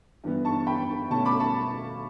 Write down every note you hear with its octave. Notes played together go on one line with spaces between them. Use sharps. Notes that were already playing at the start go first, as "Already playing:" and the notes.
G2 E3 B3
A5 C#6
G5 B5
B2 A3 C#4 A5 C#6
B5 D6
A5 C#6